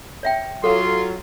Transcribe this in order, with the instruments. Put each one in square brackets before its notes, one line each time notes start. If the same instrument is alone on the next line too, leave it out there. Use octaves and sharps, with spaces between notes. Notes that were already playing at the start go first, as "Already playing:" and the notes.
[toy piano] C#5 E5 G5
[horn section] F#3 F4 [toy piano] A4 [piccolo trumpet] C6